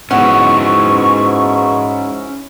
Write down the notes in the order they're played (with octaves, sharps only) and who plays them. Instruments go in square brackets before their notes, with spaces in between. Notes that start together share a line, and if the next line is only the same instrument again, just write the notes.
[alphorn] G#2 [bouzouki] B3 [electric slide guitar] C#4 E4 F#4 [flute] C#6